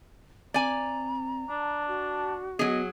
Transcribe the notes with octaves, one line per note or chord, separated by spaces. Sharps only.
C4 D5 G#5 A#5
D4 A5
F#4
F#3 B3 G#4 D#5